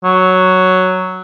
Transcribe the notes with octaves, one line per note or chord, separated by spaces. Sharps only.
F#3